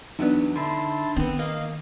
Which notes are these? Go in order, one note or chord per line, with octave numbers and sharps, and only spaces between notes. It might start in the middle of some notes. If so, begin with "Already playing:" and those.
E2 F#3 B3 D4 D#4
D3 E4 A5 C6
D#3 B3 C4
A#3 D#5 F5